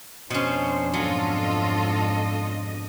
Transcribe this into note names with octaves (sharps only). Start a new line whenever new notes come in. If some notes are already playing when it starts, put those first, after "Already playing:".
F2 B2 C#4 D4 C5
G#2 F#3 F4 A4 D#5